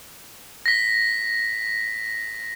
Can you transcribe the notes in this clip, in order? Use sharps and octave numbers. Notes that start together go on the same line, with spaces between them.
A#6 B6